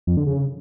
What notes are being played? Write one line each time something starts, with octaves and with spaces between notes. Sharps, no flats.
F2
D3
C#3